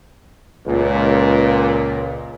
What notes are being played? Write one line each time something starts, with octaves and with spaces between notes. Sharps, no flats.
C#2 A#2